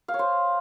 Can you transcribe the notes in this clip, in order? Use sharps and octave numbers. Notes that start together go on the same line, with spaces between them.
F5
C#5
C5